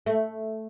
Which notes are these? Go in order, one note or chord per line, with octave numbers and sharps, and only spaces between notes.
A3